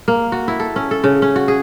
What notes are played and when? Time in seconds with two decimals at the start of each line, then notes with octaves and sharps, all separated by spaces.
0.08 A#3
0.32 F#4
0.48 E4
0.60 A4
0.76 C#4
0.91 A4
1.04 C#3
1.22 C#4
1.36 F#4
1.48 G#4